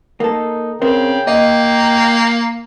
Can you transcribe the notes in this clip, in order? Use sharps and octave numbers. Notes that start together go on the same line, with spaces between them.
A#3 D#4 A4
C#3 C4 A#4 C5 G5
A#3 D#5